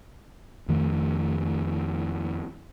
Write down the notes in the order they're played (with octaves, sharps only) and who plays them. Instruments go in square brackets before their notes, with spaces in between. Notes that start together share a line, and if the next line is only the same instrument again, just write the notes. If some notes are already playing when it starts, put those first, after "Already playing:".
[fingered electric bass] F2 D#3 A3